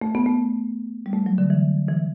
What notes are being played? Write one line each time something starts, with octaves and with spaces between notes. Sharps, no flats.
A3
B3
A3
G3
A3
F#3
D3
E3
E3